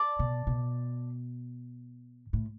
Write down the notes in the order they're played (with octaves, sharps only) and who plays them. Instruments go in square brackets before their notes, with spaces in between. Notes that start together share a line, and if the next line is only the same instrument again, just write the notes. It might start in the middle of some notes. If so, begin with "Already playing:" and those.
Already playing: [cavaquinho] D5 A5 D6
[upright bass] B2
B2
A2